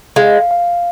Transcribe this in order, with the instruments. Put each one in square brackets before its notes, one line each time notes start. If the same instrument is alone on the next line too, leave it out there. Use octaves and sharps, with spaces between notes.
[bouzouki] G#3 [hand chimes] F5
[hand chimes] F5